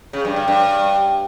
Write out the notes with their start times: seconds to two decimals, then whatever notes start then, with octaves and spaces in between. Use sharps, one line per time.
0.13 C#3
0.25 G2
0.36 G2
0.48 G2